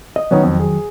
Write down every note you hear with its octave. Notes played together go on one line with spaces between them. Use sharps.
D#5
D#3 F#3 B3 C#4 D#4
F2
G#4